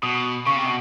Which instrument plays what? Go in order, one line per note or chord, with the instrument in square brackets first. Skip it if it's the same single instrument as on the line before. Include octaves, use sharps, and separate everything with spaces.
[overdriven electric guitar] B2 [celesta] D#6
[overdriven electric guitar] C#3 [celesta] C#6
[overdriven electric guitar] C3
B2